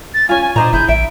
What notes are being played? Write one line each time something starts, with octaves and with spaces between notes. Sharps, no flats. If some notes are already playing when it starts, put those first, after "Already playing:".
A6
C#4 F4 G#5
G#5
A#2 D4 C5 D#5 A#5
G1 E4 G#4 G6
A#1 E5 D7